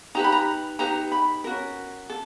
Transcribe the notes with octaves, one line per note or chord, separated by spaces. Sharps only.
D#4 G4 B4 A#5
B5
A#5
D#4 G4 B4 A#5
B5
C#4 F#4 A#4
A4